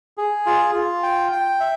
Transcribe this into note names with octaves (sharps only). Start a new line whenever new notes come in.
G#4
F4
F4
G5
G5
E5